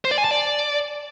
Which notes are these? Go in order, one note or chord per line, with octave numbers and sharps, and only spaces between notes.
C5
D5
G#5
A5
D5